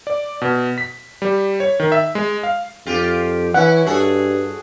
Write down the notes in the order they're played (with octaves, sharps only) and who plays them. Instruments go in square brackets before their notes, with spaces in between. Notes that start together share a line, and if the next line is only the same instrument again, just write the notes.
[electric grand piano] D5
B2
B6
G3
C#5
D#3
E5
G#3
F5
[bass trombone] F2 [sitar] F4 G4
[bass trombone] E3 [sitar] C#4 E4 [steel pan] F#5
[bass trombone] G2 [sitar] F#4 G#4 A4